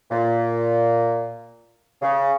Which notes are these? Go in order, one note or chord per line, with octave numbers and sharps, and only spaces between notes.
A#2
C#3